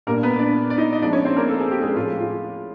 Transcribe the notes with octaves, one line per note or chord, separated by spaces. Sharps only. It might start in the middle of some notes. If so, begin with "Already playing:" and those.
A#2 G3 A#3 B3 D4 A#4
B3 B4
D4 D5
D5
D#4 D#5
D#5
F3 G#3 B3 D4 D#4 D5
C#4 C#5
C4 C5
A#3 A#4
A4
G#4
G4
G#3 G#4
A2 F3 G#3 F4
F4